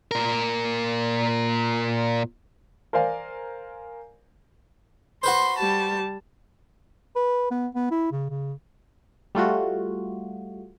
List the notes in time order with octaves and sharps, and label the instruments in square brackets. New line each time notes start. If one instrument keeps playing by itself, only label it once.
[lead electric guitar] A#2 A#4
[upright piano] A#4 C5 D5 F5 G#5
[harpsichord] F#4 B4 C5 [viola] C6
[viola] G3 A5
[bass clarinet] B4
B3
B3
E4
C#3
C#3
[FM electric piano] G3 A3 F4 F#4